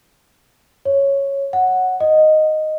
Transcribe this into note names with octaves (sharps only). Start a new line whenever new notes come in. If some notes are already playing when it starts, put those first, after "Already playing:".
C#5
F#5
D#5